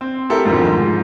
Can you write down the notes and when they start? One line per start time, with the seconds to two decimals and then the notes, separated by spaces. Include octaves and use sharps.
0.01 C4
0.30 A3 C4 E4 G4 A4 A#4
0.45 F2 G#2 B2 D3 D#3 F3
0.67 G#2